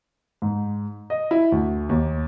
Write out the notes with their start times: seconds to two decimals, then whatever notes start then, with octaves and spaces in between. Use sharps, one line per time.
0.42 G#2
1.10 D#5
1.31 E4
1.52 D2
1.89 D#2